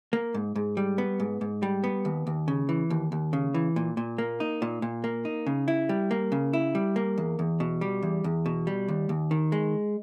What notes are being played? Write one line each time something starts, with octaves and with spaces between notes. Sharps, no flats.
A#3
G#2
G#2
G3
B3
G#2
G#2
G3
B3
D#2
D#2
C#3
E3
D#2
D#2
C#3
E3
A#2
A#2
A#3
D#4
A#2
A#2
A#3
D#4
C#3
E4
G3
A#3
C#3
E4
G3
A#3
E2
E2
B2
G3
E2
E2
B2
G3
D#2
D#2
D#3
G#3